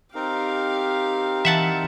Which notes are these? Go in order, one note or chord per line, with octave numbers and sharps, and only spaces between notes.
C4 D#4 G4 A#4 F5
E3 E5 F#5 A5